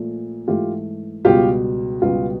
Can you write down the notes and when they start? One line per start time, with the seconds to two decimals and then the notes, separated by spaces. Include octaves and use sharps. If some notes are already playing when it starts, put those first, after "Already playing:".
Already playing: A#2 F3 A3
0.47 G#2 E3 A3 F4 G4
1.25 C#2 B2 G3 F4 G4
2.02 C#2 B2 G3 B3 F4